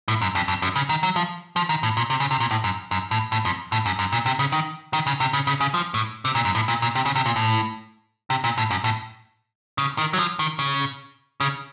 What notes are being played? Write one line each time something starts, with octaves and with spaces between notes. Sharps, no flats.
A2
F#2
F2
F2
F#2
C#3
D#3
F#3
F3
F3
D#3
A2
A#2
C3
C#3
C3
A#2
A2
F#2
F#2
A2
A2
F2
A2
F#2
F#2
A#2
C3
C#3
D#3
D#3
C#3
C3
C#3
C#3
C#3
F3
A2
C3
A#2
F#2
A2
A#2
A#2
C3
C#3
C3
A#2
A2
C3
A#2
A2
F#2
A2
C#3
D#3
F#3
F3
D#3
C#3
C#3